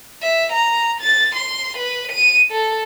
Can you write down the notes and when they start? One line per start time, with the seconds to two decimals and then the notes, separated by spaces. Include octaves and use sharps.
0.22 E5
0.52 A#5
1.01 A6
1.35 C6
1.77 B4
2.12 D#7
2.51 A4